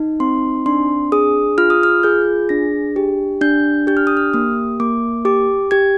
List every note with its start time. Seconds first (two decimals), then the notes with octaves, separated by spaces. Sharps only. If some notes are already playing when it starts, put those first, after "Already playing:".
Already playing: D#4
0.20 C4 C6
0.66 D4 C6
1.12 G#4 D#6
1.58 F4 F6
1.70 D#6
1.83 F6
2.03 G#4 G6
2.49 D4 A#6
2.96 G4
3.41 D4 G6
3.87 G4 G6
3.97 F6
4.07 D#6
4.17 F6
4.34 A#3 D#6
4.80 A#3 D6
5.25 G4 D6
5.71 G4 G#6